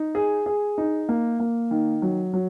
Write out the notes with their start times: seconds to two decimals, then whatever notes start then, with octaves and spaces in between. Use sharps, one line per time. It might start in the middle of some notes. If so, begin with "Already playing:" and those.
Already playing: D#4
0.15 G#4
0.46 G#4
0.78 D#4
1.09 A#3
1.40 A#3
1.71 D#3
2.02 F#3
2.33 F#3